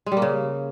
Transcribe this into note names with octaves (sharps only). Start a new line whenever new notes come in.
G#3
G3
A#3
C#3